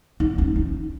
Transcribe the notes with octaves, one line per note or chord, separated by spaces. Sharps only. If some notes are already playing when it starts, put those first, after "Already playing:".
D#4
C#4
D#4